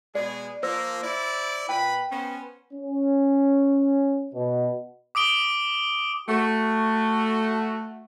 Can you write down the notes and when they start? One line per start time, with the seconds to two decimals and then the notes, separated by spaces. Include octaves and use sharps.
0.15 B2 G#3 G#4 D5
0.63 F3 A#3 C5 E6 A#6
1.03 E4 D5
1.69 A#2 B4 G5 B5
2.12 B3 C#4 C5
2.74 C#4
4.34 B2
5.15 D6 D#6 D7 G7
6.29 A3 F#4